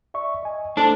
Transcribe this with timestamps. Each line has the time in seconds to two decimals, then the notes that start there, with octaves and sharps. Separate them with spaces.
0.14 D5 E5 C#6
0.43 D#5 G#5
0.77 A3 D4 A4 C5 A5